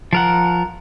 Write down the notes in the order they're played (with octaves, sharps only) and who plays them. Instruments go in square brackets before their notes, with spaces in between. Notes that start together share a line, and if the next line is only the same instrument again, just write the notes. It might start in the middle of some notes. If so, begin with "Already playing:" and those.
[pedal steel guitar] F3 A#4 F#5